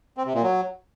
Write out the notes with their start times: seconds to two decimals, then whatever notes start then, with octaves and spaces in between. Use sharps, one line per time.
0.17 C4
0.26 C3
0.34 A#2
0.43 F#3